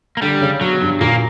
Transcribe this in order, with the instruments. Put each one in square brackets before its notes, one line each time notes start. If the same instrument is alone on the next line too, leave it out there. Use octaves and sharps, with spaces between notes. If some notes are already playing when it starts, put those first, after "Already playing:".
[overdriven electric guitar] A#3
[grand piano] D3 [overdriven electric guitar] G3
[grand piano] C#3
[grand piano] B2 [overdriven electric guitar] F#3
[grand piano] G2
[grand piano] A#2 [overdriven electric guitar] A#3